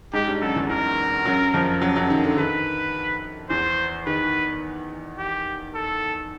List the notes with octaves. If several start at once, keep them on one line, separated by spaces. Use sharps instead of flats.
G#2 G#3 G4
G2 G3
F#2 F#3 A4
E2 E3
E2 E3 A#4
F#2 F#3
F2 F3
F#2 F#3
F#2 F#3
D#3
D3
D#3 B4
E2 E3 C5
D#3 B4
G4
A4